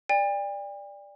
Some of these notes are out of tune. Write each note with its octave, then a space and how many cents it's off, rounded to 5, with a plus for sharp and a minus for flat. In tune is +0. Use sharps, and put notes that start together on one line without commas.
D5 +0 G5 +45